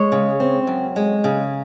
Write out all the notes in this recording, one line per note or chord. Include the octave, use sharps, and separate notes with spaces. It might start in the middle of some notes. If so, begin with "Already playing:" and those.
Already playing: G#3 C#5
C#3
C4
F#2
G#3
C#3